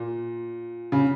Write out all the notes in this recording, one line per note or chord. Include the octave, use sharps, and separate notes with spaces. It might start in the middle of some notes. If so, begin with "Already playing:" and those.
Already playing: A#2
C#3